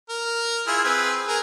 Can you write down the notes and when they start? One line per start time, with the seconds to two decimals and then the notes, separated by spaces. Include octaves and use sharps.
0.09 A#4
0.67 E4 F4 G#4
0.84 C4 G#4 B4
1.28 G#4 A#4